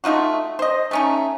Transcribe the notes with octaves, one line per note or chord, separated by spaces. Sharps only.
A3 D#4 F4 F#4
C5 D#5
A3 C#4 D#4